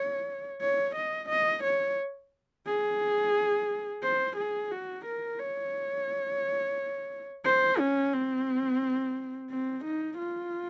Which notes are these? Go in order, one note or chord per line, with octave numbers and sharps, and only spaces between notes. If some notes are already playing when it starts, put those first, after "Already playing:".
Already playing: C#5
C#5
D#5
D#5
C#5
G#4
C5
G#4
F#4
A#4
C#5
C5
C#4
C4
C4
D#4
F4